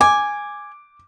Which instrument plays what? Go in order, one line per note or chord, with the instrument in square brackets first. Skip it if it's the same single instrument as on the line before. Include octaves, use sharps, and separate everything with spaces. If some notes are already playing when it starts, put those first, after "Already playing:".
[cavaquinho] G#5 [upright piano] D6